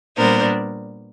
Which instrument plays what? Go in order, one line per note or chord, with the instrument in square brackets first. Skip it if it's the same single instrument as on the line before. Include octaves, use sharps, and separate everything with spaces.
[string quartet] A#2 G3 B3 D4 A#4 C5